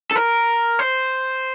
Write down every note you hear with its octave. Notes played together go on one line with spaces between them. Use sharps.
A4
A#4
C5